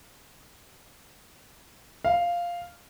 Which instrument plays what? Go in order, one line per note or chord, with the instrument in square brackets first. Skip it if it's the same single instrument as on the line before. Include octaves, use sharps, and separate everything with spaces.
[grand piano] F5